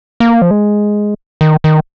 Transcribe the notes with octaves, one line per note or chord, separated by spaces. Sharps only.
A#3
F3
G#3
D#3
D#3